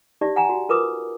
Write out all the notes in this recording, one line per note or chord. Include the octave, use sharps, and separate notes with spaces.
D#4 G4 D5 E5
F#5 G#5 A#5
F#4
F4 A#4 B4 D6 D#6